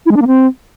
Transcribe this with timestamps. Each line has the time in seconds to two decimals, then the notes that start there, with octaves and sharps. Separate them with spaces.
0.06 E4
0.11 G#3
0.16 D4
0.22 A#3
0.27 C4